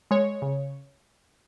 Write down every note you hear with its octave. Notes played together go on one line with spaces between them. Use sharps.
G#3 C#5
C#3